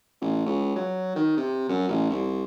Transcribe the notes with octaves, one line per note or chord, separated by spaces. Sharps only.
A1
C#2
F#3
D#3
C3
F#2
A1
C2